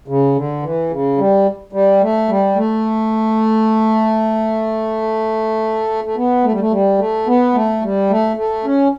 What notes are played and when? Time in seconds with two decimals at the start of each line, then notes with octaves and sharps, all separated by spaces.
0.08 C#3
0.35 D3
0.63 E3
0.91 C#3
1.18 G3
1.73 G3
2.01 A3
2.29 G3
2.56 A3
6.04 A3
6.16 B3
6.44 A3
6.52 G3
6.60 A3
6.71 G3
6.99 A3
7.27 B3
7.54 A3
7.82 G3
8.10 A3
8.37 A3
8.64 C#4